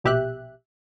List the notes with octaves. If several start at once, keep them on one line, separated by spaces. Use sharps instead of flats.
A#1 B2 G4 E5 F#6